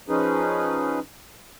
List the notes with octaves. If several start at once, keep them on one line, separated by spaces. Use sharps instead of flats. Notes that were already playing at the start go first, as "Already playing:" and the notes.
F3 C#4 D#4 G#4 B4